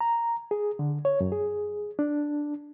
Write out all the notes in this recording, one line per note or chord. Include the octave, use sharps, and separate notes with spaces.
A#5
G#4
D3
C#5
F#2
G#4
D4